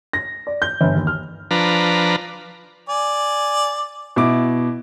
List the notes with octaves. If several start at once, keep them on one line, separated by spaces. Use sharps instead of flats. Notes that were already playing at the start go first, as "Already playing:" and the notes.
A#6
D5
G6
G1
D#2
F6
F3 D4 B4 A#5
D5 G#5
B2 E4 D6